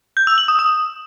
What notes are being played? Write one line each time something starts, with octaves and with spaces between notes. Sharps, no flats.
G6
E6
F#7
D#6
D#6